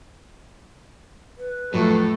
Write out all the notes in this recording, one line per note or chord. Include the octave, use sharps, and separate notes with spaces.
B4
F2 A2 F#3 A3